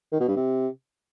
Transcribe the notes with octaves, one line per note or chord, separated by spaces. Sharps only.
D#3
B2
G2
C3